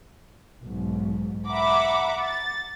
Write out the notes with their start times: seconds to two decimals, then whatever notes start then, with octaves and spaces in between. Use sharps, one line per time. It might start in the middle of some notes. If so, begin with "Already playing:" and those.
0.65 B1 G#2
1.48 E5 F#5 A#5 B5 D6
2.22 A6